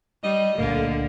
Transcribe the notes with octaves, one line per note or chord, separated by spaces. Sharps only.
G3 D#5
C#2 A#2 D3 A3 A#3